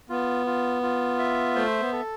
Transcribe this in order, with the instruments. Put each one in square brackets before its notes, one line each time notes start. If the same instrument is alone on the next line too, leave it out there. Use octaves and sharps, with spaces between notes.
[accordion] B3 [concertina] F4
[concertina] F4
F4
E5
[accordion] A3 [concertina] C5
[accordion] B3
[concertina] A4